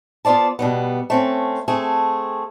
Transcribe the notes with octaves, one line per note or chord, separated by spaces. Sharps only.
B3 F4 C5 D5 A5
B2 G3 B3
A3 C4 C#4
A3 C4 G#4